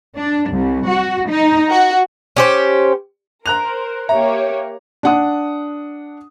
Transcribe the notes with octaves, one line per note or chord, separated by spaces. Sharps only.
D4
C2
F#4
D#4
F#4
C#4 G4 C5
A#4 C5 A#5 F#6 F7
A#3 G4 C#5 E5 A#5
D4 F#5 D#6